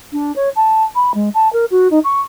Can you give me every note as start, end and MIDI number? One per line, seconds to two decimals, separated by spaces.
0.13 0.34 62
0.36 0.50 73
0.56 0.84 81
0.95 1.12 83
1.14 1.29 56
1.34 1.51 81
1.53 1.65 70
1.71 1.88 66
1.91 2.00 63
2.04 2.21 85